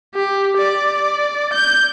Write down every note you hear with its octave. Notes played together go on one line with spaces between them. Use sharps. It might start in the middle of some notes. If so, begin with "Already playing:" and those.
G4
D5
G6